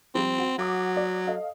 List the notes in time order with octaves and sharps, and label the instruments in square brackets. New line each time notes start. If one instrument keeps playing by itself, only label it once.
[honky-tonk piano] F3 G3 [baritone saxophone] C4
[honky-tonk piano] F#4
[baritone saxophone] F#3 [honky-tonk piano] F#5 D6 D#6
[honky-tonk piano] D5
A4 D#5 F5